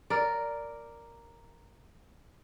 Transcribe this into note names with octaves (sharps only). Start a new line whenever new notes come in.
A#4 D5